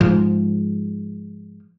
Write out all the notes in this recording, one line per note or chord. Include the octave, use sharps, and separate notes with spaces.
G#2 F3